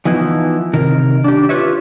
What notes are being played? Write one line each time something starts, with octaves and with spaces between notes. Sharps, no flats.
E3 F3 B3 D#4 E4
C3 D#3 A#4
D4 G4
F4 G4 A4 B4 C#5 E5